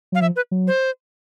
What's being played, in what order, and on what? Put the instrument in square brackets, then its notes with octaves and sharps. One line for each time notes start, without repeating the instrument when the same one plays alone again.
[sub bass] F#3 [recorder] F5
[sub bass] F3 [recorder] E5
[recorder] B4
[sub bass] F#3
[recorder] C5